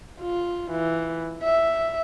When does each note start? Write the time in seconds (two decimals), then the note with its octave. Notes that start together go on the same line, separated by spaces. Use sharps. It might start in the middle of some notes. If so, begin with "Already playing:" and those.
0.21 F4
0.72 E3
1.43 E5